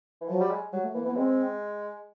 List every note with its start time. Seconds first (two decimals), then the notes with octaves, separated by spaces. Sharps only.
0.21 E3
0.29 F3 F#3
0.40 G3
0.51 G#3
0.73 F#3 G3
0.83 A3
0.94 E3 A#3
1.05 E3 B3
1.16 G#3 C4